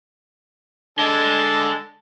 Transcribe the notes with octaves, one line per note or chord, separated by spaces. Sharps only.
D3 G#3 A5